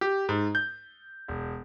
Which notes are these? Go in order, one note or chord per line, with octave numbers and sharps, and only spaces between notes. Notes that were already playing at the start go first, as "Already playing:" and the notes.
G4
G#2
G6
E1